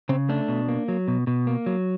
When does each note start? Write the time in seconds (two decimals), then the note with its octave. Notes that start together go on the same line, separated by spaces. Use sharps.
0.09 C#3 C4
0.29 A3 D4
0.48 B2
0.68 A#3
0.88 F#3
1.08 B2
1.27 B2
1.47 A#3
1.66 F#3